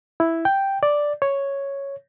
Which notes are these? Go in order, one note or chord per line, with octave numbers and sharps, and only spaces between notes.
E4
G5
D5
C#5